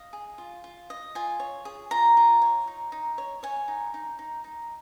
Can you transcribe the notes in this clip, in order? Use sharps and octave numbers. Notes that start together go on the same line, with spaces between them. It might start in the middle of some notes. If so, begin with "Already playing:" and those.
Already playing: D#5 F5
G#4
F4
F4
D#5
F4 G#5
C#5
G#4
F4 A#5
F4
C#5
D#4
D#4
C#5
C#5 G#5
D#4
D#4
D#4
D#4